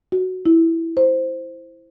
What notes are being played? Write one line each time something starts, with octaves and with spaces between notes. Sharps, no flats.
F#4
E4
C5